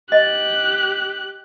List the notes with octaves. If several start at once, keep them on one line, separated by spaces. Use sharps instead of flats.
G4 D#5 F#6